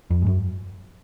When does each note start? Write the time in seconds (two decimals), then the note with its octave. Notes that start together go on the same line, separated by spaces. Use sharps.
0.10 F2
0.22 G#2
0.26 F#2